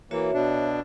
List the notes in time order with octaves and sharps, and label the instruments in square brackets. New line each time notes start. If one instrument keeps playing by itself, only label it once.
[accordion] E3 A#3 [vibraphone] F#4 C#5 E5
[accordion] B2 D4